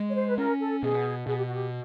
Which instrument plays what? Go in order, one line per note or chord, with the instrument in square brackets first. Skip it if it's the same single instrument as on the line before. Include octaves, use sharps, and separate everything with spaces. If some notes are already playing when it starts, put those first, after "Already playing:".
Already playing: [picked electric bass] G#3
[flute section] C#5
C5
B4
[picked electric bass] C#4 [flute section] A#4
[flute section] A4
[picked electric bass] B2 [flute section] G#4
[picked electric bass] B2 [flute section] G#4
[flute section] G4
F#4
G4